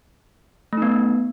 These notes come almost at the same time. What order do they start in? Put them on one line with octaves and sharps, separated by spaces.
A3 D#4 B3